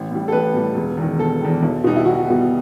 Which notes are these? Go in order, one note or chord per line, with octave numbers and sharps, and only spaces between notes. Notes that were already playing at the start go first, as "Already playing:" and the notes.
Already playing: A1
A2 G3
A4
A1 B4
A2 G3
E1
E2 D#3
E1 A4
E2 D#3
B1
B2 G3 D#4
E4
B1 F#4
B2 G3